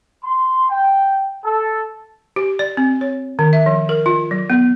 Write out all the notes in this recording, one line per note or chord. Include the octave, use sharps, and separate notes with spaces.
C6
G5
A4
G4
D5
C4
C#5
D#3
E5
F3
A#4
F4
F#3
B3